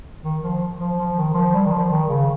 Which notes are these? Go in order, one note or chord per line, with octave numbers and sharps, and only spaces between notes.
D#3
F3
F3
F3
D#3
F3
G3
D#3
F3
D#3
C#3